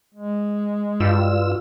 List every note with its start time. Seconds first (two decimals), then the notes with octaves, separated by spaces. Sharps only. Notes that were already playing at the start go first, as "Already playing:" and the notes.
0.14 G#3
1.00 G2 F4 E6